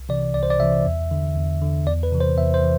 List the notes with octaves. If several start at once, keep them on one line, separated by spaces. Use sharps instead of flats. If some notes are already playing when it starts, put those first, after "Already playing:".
Already playing: C2
C3 E3 D5
C2 D5
C5
D5
C3 E3 E5
E2
D3
E2
D3
E2 D5
B4
C3 E3
C5
E2 E5
C5
E3